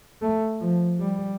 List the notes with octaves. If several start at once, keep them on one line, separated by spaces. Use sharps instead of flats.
A3
F3
G3